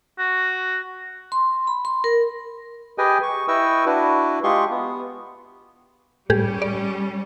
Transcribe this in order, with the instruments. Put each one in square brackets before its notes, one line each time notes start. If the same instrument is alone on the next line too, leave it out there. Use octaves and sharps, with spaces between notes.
[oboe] F#4
[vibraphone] C6
B5
C6
A#4
[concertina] G4 G#4 B4 D#5 G5 G#5
C#6
E4 B4 D#5 G5 C#6 E6
D4 E4 F#4 B4
G#3 F4 G4 G#4 C6 C#6
B3
[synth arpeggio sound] A2 G4 G#4 [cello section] G3 C#4
[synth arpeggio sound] D5